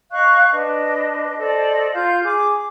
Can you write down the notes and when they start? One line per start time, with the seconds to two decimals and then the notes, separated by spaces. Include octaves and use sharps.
0.11 D#5 F5 C#6 F#6
0.52 D4 B4 D#5
1.39 A4 C5 D5 D#5
1.93 F4 F5 G6
2.24 G#4 D6